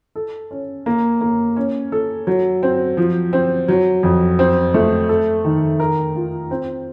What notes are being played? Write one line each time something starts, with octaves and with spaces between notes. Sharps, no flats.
A4
C#4
A#3
A#3
C#4
A4
F#3
C4
F3
C4
F#3
F2
C4
A3
A4
D#3
A#4
F4
C4